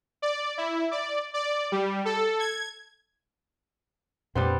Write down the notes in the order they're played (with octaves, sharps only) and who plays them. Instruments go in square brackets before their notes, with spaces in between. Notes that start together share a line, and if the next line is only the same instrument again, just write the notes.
[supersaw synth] D5
E4
D5
D5
G3
A4
G#6
[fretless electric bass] F2 A#2 D4 [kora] G3 B3 C4